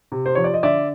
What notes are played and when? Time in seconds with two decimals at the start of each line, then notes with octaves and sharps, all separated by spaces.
0.12 C3
0.26 C5
0.35 F3 C#5
0.44 D5
0.54 D#5
0.63 D3 D5 E5